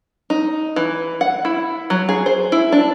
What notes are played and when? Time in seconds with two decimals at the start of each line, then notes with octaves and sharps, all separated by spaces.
0.30 D#4
0.76 E3
1.21 F#5
1.45 E4
1.90 F#3
2.09 G#4
2.26 C5
2.52 E4
2.72 D4